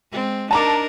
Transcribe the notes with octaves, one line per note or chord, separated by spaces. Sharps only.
G#3 C4
D4 D#4 A#4 A5 A#5 D6